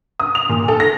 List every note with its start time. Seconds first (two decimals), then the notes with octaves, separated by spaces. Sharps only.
0.20 D#6
0.35 F7
0.49 A#2
0.68 A4
0.80 A#6